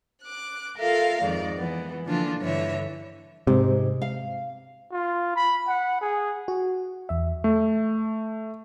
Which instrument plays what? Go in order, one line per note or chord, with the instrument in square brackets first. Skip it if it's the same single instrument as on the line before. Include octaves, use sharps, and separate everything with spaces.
[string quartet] D6 F#6
F4 A4 A#4 E5 F5
F2 G#2 D#3 D5
E3 B3
D3 E3 F3 A#3 D4 F4
G2 D3 E3 C#5 E5
[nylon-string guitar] G#2 [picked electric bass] C3
[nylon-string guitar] F5
[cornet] F4
B5
F#5
G#4
[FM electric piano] F#4
E2 E5
[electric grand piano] A3